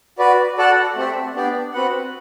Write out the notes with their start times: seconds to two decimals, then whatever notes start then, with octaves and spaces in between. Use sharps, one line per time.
0.19 F#4 B4 D5
0.58 F#4 A4 D5 F#5 A5
0.96 A3 C4 G4 C5 E5
1.35 B3 D4 G4 D5
1.73 C4 F#4 B4 F#5